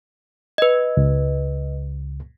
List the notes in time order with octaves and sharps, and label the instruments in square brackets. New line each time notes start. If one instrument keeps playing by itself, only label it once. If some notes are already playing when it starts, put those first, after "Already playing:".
[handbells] B4 D#5
[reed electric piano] C#2